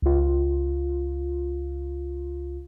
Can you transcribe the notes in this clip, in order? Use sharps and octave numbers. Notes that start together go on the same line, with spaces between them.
C#2 F4